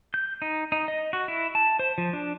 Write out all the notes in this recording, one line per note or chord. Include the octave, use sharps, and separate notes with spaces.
G6
D#4
D#4
D#5
F#4
E4
A5
C5
F3
D4